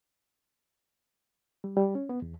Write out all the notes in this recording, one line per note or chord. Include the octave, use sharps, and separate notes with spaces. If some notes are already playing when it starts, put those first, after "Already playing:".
G3
G3
C#4
B3
E2